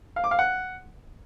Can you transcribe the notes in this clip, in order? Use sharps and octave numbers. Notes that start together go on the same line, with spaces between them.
F5
D6
F5
F#5